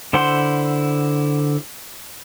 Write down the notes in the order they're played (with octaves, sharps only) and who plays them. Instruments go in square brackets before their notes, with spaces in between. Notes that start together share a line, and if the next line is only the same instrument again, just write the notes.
[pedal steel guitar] D3 E4 C5 F#5 C6